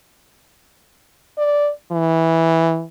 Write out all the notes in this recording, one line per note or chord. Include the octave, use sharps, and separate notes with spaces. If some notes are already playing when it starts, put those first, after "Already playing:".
D5
E3